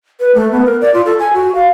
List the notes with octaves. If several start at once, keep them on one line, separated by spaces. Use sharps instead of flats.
B4
A3
B3
A#4
D5
F4
A4
G#5
F#4
F5